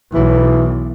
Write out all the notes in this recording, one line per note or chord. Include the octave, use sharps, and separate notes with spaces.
B1 E3